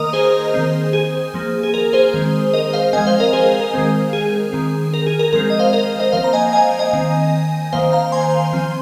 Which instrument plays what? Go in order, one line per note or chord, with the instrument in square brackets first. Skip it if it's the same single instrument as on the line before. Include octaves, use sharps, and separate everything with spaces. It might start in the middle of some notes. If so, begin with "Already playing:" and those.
Already playing: [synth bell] D#3 A#3 A#4 D#5 A#5 D#6
G#4 C5
D#3 C4
G#4
F3 A#3
G#4
A#4
G#4 C5
D#3 G#3 C4
A#4 D#5
C5 F5
F3 G#3 C4 D#5 G#5
C5 F5
A#4 D#5
G#4 C5
A#4
A#4
D#3 G#3 C4
G#4
D#3 C4
A#4
G#4
A#4
F3 G#3 C4 A#4
D#5
C5 F5
A#4 D#5
A#4 D#5
F3 A#3 C5 F5
A#5
D#5 G#5
D#5 G#5
D#5 G#5
D#3 C4
D#3 A#3 C5 F5
F5 A#5
G#5 C6
F3 C4